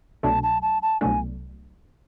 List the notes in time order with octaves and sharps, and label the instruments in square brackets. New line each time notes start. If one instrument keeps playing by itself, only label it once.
[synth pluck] C2 B2 F#3 A3 D4 [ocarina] A5
[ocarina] A5
A5
A5
[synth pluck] C2 B2 F#3 A3 D4 [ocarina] G#5